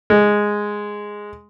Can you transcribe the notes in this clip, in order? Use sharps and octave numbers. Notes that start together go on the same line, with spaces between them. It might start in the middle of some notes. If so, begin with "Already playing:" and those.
G#3